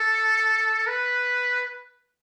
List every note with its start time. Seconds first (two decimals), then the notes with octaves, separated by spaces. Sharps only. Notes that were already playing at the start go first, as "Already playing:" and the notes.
Already playing: A4
0.87 B4